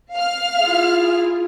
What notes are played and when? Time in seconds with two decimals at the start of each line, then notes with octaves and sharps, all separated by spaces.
0.15 F5 F6
0.62 E4 F4 G#4